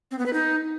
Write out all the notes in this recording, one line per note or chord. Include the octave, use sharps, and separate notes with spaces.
C4
B3
B4
D#4